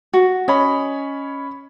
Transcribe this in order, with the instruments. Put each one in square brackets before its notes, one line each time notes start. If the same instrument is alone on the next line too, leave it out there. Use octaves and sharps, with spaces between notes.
[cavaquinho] F#4
[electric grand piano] C#4 C#5 B5 [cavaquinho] D#5